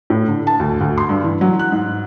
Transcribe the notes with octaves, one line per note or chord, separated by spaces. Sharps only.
A2
D3
A5
D2
D2
C6
G2
E3
F#3
F#6
G#2